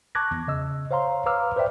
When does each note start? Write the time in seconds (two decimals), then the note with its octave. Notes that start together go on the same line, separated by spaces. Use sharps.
0.15 A5 C#6 D6 F#6 G#6 A#6
0.31 E2
0.48 C#3 D#5 E6
0.91 C5 C#5 F5 A#5 C6
1.26 B4 F5 A#5 D6 E6 F6
1.56 B4 C5 D5 E5 G5